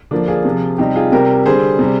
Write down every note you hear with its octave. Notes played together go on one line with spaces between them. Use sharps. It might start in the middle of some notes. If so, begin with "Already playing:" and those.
D3 F3 A#3 D4
F4 G#4
C3 F3
C3 G3 D#4 G4
F4 G#4
C3 G3 G4 A#4
D3 G3 G#4 C5
C3 G3